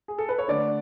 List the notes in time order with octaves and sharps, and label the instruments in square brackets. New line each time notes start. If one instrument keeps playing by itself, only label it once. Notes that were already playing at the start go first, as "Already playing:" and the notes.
[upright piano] G#4
A4
B4
C#5
D3 A3 D4 D5